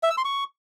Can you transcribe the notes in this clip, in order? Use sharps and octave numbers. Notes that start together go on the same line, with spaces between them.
E5
E6
C6
C#6